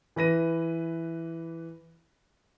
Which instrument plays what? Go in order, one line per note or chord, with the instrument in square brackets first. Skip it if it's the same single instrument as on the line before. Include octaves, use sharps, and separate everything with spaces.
[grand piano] E3 B4 A#6 D#7